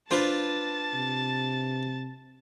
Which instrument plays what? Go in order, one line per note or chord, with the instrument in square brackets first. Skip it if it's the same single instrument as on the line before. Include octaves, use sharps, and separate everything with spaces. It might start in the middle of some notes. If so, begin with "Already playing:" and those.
[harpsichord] D4 F4 B4 [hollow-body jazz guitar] C5 [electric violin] A5 A6
[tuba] C3